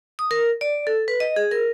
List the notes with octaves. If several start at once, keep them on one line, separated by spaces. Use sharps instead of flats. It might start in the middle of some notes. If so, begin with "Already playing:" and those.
D#6
A#4
D5
A4
B4
D#5
G#4
A#4